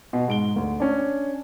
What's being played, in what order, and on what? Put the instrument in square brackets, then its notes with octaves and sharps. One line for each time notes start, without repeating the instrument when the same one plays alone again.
[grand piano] B2
G#2 D7 G7
D2
C#4 D4